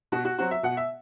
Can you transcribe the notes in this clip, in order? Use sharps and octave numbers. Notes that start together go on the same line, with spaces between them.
B2 F#4
F#4
F#3 C4 F#4
E5
B2 F#5
E5